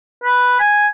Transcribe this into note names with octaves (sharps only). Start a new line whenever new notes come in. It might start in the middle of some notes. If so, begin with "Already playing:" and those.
B4
G#5